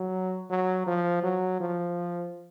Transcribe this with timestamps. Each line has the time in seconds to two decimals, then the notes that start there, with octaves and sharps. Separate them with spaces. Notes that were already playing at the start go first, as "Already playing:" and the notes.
Already playing: F#3
0.50 F#3
0.87 F3
1.23 F#3
1.60 F3